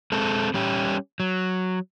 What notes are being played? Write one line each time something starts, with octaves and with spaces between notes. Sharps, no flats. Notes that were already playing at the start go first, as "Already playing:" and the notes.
G#3 C4 A4
G3 C#4 G4
F#3